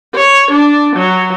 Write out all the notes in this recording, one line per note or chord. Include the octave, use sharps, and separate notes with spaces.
C#5
D4
F#3